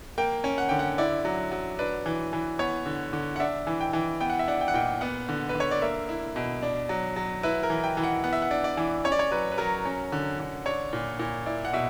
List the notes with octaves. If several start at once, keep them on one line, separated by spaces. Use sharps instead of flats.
A#3 G5
C#4
F#5
D3 G5
F#5
E4 D5
F#3
F#3
D4 B4
E3
E3
B3 C#5
D3
D3
F#5
D4 E5
E3
G5
E3
B3 G5
F#5
E5
D4 F#5
G5
F#5
A#2 G5
B3 F#5
D3
B4
D3
C#5
D5
A#3 E5
E4
B2
D4
F#3
F#3
E4 B4
A#4
E3
G5
E3
F#5
B3 F#5
E5
F#5
D4
D5
E3
C#4 C#5
D5
C#5
F#3 B4
B4
F#3 A#4
C#4
D3
D3
D4 C#5
A#2
A#2
E4 D5
F#5
B2 E5